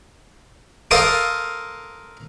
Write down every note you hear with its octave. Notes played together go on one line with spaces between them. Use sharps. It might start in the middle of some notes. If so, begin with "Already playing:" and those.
A4 A#4 C5 F5 C6 D#6